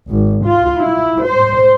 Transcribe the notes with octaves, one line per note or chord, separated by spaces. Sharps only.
G#1
F4
E4
C5